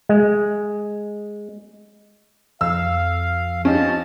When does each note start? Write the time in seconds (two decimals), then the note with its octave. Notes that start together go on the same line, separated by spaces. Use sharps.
0.09 G#3
2.61 F2 F5 E6
3.65 F3 C#4 D#4 G4 A5